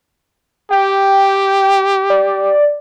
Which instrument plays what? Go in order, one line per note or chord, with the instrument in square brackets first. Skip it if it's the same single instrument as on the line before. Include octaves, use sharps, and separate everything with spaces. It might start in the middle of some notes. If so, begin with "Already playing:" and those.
[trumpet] G4 [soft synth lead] G5
[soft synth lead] D5